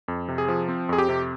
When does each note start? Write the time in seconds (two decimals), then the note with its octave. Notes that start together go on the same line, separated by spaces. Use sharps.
0.08 F2
0.28 C3
0.38 G#4
0.48 F3
0.69 C4
0.89 F2 G#4
0.98 G4
1.09 C3